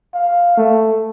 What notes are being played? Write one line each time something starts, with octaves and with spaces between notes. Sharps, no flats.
F5
A3